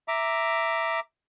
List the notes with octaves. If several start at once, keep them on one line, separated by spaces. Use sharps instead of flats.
E5 A#5 D6